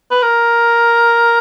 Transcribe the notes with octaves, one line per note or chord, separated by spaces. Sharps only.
B4
A#4